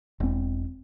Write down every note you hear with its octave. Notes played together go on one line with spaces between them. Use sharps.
E1 C4